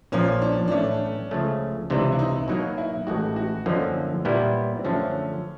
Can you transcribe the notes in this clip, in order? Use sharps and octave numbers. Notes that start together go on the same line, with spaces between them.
A#1 A#2 F3 C#4
D4
D4
B1 A2 E3 A3 C#4
C#2 C#3 F3 A3 C#4
C#2 C3 E3 D4
E4
D#4
B2 F#3 A#3 D#4
E4
A1 A2 E3 G#3 F#4
F#4
F#2 D3 F3 A#3 C#4 D#4
A#2 G3 B3 E4
C4
F#2 D3 F3 A3 C#4 D4